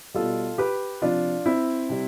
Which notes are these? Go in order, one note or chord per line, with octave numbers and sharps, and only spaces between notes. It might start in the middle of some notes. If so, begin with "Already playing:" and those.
B2 G3 F4 A4
G4 B4
C3 F3 D4 F4
C4 E4
C3 G3